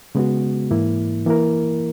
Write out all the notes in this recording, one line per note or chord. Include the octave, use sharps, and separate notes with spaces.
C#3 G#3 B3 F#4
G#2 E3 A#3 E4
E3 A#3 E4 A#4